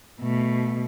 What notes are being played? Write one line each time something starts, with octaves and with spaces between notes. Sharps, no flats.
B2 A3